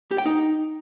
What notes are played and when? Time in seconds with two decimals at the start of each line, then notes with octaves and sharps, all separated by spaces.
0.11 G4
0.18 G5
0.26 D#4